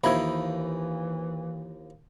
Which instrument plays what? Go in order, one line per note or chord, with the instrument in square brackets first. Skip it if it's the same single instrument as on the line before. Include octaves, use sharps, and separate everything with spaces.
[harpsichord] D#2 F3 D#5 [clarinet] E3 [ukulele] E4 B5 [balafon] C5 E5